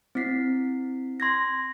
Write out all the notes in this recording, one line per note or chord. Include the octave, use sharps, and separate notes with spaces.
C4 E4 B6 C7
C6 G#6 A#6